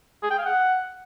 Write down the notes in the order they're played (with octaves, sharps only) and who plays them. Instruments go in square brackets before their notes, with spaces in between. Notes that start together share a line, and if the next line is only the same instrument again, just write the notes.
[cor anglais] G#4
G5
F5
F#5